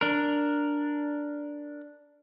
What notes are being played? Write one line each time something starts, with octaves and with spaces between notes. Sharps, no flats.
D4 A#4